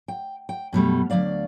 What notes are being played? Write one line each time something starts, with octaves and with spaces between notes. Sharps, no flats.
G5
G5
F#2 B2 G3 A3
D2 G2 F#3 D5 F5